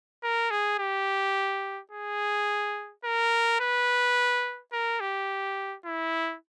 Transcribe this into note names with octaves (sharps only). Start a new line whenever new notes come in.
A#4
G#4
G4
G#4
A#4
B4
A#4
G4
E4